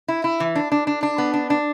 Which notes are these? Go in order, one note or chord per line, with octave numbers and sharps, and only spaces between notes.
E4
E4
E3
D4
D4
D4
D4
B3
D4
D4